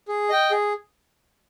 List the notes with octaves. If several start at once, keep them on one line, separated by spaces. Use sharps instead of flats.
G#4
D#5 G5
G#4